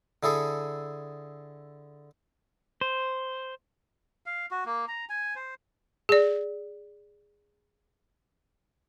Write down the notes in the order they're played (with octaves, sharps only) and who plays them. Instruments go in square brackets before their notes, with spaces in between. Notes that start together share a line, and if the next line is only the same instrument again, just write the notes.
[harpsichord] D3 E4 G#4 A4
[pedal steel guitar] C5
[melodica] F5
F#4
A#3
A#5
G#5
C5
[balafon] G#4 D5